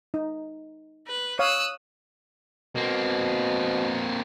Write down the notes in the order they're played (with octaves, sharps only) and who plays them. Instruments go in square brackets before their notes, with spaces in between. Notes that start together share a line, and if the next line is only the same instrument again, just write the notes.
[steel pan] D#4
[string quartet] B4
[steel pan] C#5 F5 [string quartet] D#6 E6 F#6
[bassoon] B2 [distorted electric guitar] A#3 C4